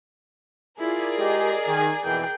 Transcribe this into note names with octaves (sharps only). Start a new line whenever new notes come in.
E4 F4 G#4 A#4 D5
G#3 G4 D#5
D#3 G#5
F2 B2 E3 G5